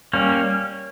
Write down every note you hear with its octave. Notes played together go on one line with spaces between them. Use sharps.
G3 A#3 C#4